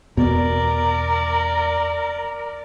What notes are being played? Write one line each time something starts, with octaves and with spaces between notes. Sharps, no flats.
E2 B2 A#4 D5